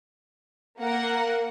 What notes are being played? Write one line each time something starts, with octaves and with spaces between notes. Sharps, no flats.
A#3 A#4 F#5